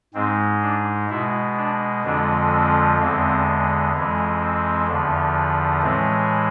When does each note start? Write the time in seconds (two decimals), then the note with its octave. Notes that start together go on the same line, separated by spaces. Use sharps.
0.14 G#2 G#3 C4
0.62 D4
1.09 B2 G#3 E4
1.56 D4
2.04 F2 D3 F3 G#3 D4
2.51 C4
2.98 E2 D3 G#3 C4
3.93 F2 E3 G#3
4.40 C4
4.88 E2 D3 F3
5.82 A2 E3 G#3 C4